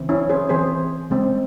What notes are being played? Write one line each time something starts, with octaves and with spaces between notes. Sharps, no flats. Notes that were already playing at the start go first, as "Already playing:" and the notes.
Already playing: C#3 E3 C4
C#4 E4
G#4 C5
E3 C4 G#4 C5
C#3 G#3 C4